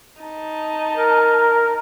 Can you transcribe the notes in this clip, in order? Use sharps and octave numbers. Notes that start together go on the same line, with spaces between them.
D#4 A5
A#4